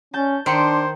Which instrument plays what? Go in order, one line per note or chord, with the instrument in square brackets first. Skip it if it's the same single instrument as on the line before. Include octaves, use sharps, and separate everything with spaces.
[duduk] C#4 [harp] A5 G6
[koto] D#3 [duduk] D4 [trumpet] C5 [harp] C6 C#7 D7